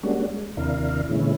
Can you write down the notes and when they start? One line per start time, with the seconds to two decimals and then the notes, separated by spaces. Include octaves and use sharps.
0.03 G3 G#3 A#3 C#4 D4 F#4
0.30 G#3
0.57 D#2 C3 D4 E4 A#4 F5
1.09 A#2 D3 E3 G#3 C#4 E4